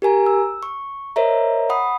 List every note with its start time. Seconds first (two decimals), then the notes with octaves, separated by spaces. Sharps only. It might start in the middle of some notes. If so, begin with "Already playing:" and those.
0.02 G4 A#4 G#5 A#5
0.26 E6
0.63 C#6
1.16 A#4 C5 C#5 D#5 E5 A#5
1.70 F#5 B5 D#6